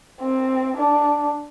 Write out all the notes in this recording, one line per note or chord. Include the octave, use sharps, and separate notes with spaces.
C4
D4